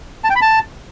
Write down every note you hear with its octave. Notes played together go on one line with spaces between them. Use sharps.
A5
G5
B5
A5